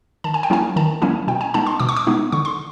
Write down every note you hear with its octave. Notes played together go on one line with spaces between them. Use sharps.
D#3 A5
G#5
G5
F#3 A#3 C#4 E4 G#5
D#3 A5
F#3 A#3 C#4 E4 G#5
B2 G5
G#5
G#3 B3 D#4 A5
C6
B2 D6
C#6
D6
G#3 B3 D#4
D3 C#6
C6